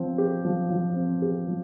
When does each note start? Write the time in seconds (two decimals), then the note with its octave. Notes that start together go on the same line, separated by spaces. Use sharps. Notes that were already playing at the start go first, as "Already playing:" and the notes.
Already playing: F3 C4
0.18 G4
0.45 F3
0.70 F3
0.96 C4
1.22 G4
1.48 F3